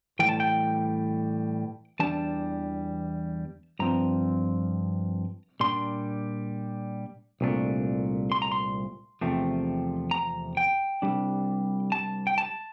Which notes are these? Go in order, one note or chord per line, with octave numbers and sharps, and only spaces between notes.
A2 E3 G3 G5
A5
G5
E2 E3 G3 D4 A5
G2 F3 C4 A#5
A#2 G3 D4 C6
C2 A#2 A3 D4
C6
A#5
C6
E2 C3 F3 A3 C4
A#5
G5
C2 A#2 G3 D4
A5
G5
A5